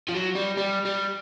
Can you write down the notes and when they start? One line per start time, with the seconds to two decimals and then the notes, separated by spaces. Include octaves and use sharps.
0.08 F3
0.14 F#3
0.35 G3
0.57 G3
0.85 G3